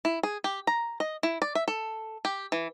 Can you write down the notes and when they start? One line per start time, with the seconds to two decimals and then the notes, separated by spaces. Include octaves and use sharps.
0.05 E4
0.23 G#4
0.44 G4
0.67 A#5
1.00 D#5
1.23 E4
1.42 D5
1.55 E5
1.68 A4
2.25 G4
2.52 E3